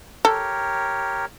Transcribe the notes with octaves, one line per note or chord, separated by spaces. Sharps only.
G4 A4 A#4 C#5